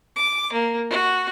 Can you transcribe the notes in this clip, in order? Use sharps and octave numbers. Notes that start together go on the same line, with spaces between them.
D6
A#3
F#4